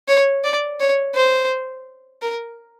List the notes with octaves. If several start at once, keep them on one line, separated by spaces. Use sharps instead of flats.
C#5
D5
C#5
C5
A#4